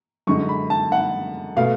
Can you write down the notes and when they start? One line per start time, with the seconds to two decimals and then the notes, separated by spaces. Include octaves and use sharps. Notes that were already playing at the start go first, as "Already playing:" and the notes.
0.27 F#2 D3 G#3 C#6
0.49 B5
0.70 A5
0.92 F#5
1.57 B2 A3 F5